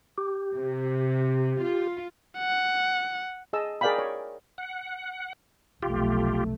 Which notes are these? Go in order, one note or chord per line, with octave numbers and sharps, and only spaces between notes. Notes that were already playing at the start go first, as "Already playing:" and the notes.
G4
C3
F4
F#5
G#4 D#5 A5 E6
G#4 A#4 D5 F5 G5 B5
C#5
F#5
F1 B1 A3 F4 G4